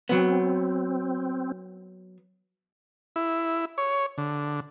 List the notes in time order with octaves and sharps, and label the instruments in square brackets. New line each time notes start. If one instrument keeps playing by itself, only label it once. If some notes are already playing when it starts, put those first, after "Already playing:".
[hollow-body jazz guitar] F#3 B3 [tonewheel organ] C4
[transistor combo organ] E4
C#5
D3